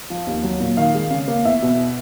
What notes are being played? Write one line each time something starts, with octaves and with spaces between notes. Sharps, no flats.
F3
D#2
F#3
A#2
D#3 F5
G#3
C#3
A#3
E2 E5
B2